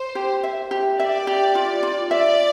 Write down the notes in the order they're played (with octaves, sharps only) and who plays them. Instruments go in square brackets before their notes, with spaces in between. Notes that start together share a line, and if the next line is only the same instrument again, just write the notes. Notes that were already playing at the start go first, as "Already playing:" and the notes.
Already playing: [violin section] C5
[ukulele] G4
E5
G4
[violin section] D5 [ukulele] E5
[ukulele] G4
F4
F4
[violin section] D5 [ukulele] E5